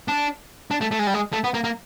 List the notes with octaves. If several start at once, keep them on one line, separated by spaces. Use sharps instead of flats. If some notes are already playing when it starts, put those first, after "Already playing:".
D4
D4
A3
A3
G#3
G3
G#3
A3
B3
A#3
A#3